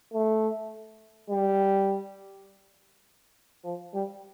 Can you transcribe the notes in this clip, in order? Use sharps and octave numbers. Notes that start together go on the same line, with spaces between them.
A3
G3
F3
G3